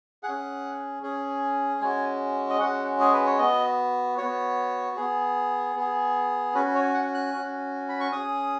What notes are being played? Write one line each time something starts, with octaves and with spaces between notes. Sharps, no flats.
G#4 F#5
C#4
C#4 G#4
G#3 C#4 F#4 G#5
D#5
G#3 C#4 F#4 F#5
G#4
B4
C#5
B3 F#4 D#5
B3 F#4 C#5
B3 G#4
B3 G#4
C#4 F#4 B4
C#5
F#5
F#6
C#4 F#4
B5
C#6
C#4 G#4 D#6